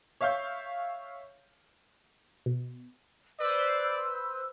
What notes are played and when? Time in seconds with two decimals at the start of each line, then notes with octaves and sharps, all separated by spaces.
0.21 C#5 E5 F5 C#6 G6
2.46 B2
3.40 B4 C5 D5 E6